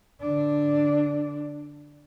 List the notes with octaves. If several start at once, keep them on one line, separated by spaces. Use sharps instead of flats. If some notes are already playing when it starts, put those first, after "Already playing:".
D3 D4